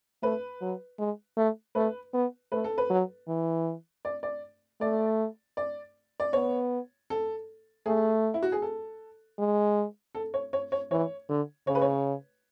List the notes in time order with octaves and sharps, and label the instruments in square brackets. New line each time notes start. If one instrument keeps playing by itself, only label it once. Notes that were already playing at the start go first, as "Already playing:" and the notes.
[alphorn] A3 [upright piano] B4
[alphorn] F#3
G#3
A3
[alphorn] A3 [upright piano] B4
[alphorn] B3
[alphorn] A3 [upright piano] B4
[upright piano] A4
B4
[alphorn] F#3
E3
[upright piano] D5
D5
[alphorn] A3 [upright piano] D5
[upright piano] D5
D5
[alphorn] B3 [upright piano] C#5
[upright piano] A4
[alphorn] A3 [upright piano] G#4
[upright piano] E4
F#4
G#4
A4
[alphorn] G#3
[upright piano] A4
C#5
C#5
C#5
[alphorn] E3 [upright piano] C#5
[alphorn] D3
[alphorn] C#3 [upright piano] C#5
[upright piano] B4
C#5